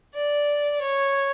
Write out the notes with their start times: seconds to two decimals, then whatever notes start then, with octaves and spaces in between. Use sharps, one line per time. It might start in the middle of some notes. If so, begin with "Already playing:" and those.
0.14 D5
0.81 C#5